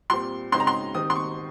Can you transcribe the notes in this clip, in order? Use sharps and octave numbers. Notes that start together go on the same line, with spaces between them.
A#2 G3 C4 C6
C#3 G#3 C4 D#4 C6
A#5
C6
D#3 G3 C4 D#4 D#6
C6
C#6